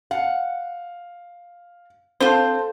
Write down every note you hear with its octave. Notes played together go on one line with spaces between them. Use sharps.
F5 F#5
C4 D4 F4 A4 C5 F5